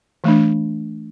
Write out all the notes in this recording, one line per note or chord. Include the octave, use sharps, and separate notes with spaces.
E3 A3 D4